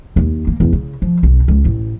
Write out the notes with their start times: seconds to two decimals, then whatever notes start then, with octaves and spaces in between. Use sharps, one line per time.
0.16 D#2
0.47 A#3
0.60 E2
0.73 C#3
1.02 F3
1.23 B1
1.48 C#2
1.65 A1